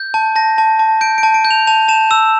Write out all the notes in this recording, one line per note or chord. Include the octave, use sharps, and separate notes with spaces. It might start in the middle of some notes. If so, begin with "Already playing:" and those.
Already playing: G6
A5
A5 A#6
A5
A5
G6 D7
D7
A5
D7
G6
F7
A5 F7
A5 E7
E6 E7